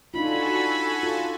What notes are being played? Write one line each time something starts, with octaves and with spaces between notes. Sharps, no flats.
D4 D#4 F4 F#4 A4 G#5 B5
F4